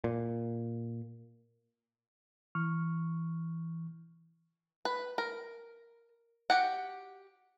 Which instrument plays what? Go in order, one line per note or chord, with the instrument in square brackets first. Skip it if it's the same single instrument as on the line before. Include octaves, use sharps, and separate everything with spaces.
[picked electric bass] A#2
[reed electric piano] E3 C#6 F6
[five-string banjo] B4
A#4
F#4 G4 F#5